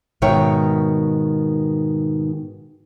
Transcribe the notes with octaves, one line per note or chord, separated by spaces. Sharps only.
G#2 B2 D#3 C#5 E5 G5